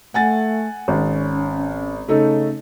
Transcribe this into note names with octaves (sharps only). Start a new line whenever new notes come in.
A3 F#5 G#5 A6
G#1 C#4
C#3 A3 D#4 A4